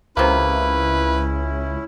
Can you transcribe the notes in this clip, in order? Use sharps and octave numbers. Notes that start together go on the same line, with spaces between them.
C#2 C3 A#3 C#4 E4 B4